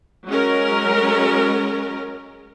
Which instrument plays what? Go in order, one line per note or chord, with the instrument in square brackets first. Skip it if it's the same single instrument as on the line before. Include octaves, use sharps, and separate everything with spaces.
[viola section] F#3 G#3 C#4 A#4